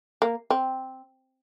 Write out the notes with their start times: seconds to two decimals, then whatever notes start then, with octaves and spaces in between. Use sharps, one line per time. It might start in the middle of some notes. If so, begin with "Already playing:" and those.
0.22 A#3
0.50 C4